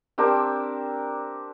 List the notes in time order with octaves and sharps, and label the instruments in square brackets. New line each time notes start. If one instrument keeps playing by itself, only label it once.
[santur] C4 D4 G4 A#4